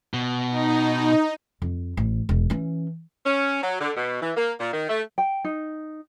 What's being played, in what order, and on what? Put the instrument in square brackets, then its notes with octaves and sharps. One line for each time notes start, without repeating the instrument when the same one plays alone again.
[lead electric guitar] B2
[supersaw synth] D#4
[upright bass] F2
A1
E1
E3 C#4
[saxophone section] C#4
F#3
D3
B2
E3
A#3
A#2
D#3
A3
[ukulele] G5
D#4